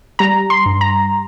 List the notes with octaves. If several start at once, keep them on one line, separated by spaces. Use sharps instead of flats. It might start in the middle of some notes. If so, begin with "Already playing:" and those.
G3 A#5
C6
G2
A#5